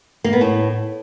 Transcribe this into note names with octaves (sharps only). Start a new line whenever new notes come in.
A#3
B3
A2